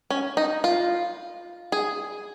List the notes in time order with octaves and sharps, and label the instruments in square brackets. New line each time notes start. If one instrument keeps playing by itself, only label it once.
[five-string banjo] C#4
D#4
F4
G#4